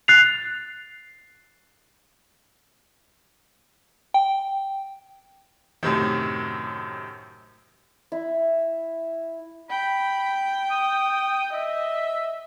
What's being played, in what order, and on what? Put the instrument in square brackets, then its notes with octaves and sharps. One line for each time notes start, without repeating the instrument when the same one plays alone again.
[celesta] F#6 A6 C7 F7
[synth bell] G5
[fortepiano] F#2 A2 C3 D#3
[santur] E4
[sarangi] G5 [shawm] B5
[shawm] D#6
[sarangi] D#5 [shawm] E5